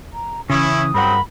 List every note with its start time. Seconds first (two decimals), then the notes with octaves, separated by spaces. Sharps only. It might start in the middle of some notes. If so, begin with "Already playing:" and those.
0.14 A#5
0.50 C#3 E3 C#4 E4 D#6
0.94 G2 C#3 F#3 C4 A#4 F#5 B5